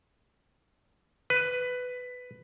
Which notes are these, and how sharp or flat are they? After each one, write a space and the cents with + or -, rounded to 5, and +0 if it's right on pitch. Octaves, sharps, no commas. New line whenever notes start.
B4 +10